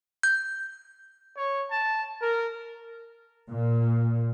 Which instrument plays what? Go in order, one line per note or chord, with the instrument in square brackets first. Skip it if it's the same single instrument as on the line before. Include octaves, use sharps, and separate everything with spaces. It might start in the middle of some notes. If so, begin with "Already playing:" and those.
[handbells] G6
[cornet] C#5
A5
A#4
[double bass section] A#2